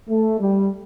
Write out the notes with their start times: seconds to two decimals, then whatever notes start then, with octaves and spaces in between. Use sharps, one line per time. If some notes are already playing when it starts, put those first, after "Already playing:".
0.08 A3
0.39 G3